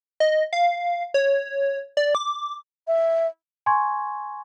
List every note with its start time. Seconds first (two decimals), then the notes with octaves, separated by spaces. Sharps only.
0.20 D#5
0.53 F5
1.14 C#5
1.97 D5
2.15 D6
2.87 E5
3.66 G#5 C6 C#6 G#6